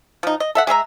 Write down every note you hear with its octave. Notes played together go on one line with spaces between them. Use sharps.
F3 D#4
D#5
A4 E5 F#5
G#3 G#4 E5 A#5